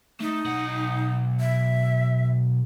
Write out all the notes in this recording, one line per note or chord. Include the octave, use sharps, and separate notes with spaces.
A3 D#4
B1 F#5
E5